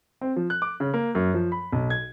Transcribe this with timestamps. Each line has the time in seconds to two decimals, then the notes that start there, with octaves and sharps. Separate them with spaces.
0.21 C4
0.36 F3
0.50 F#6
0.62 D6
0.80 C#3
0.94 A#3
1.15 F#2
1.34 F3
1.52 B5
1.72 B1
1.90 G#6